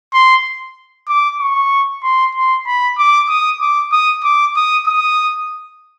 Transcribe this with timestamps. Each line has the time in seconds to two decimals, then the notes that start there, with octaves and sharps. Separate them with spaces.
0.13 C6
1.08 D6
1.40 C#6
2.03 C6
2.35 C6
2.67 B5
2.98 D6
3.29 D#6
3.60 D6
3.92 D#6
4.24 D6
4.56 D#6
4.87 D#6